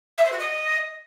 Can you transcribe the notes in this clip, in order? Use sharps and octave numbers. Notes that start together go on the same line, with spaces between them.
E5
C5
F#4
D#5